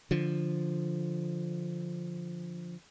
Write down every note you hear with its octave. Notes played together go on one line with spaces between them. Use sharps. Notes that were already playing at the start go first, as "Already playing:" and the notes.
D3 F3